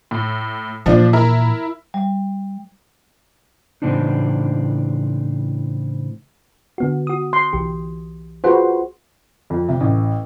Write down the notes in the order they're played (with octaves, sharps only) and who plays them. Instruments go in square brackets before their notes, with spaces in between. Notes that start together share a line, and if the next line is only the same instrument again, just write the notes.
[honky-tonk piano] A2
[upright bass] A#2 E3 [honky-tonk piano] F3 D4
[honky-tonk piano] E4 A#4
[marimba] G3
[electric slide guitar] A2 C#3 E3 C4 D4 D#4
[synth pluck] D3 B3 F#4
F#4 D#6
[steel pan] C6
[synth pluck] B1 E3 G4
[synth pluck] F4 G#4 F#5 [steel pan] F#4 B4 C5
[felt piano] F2
C3
A1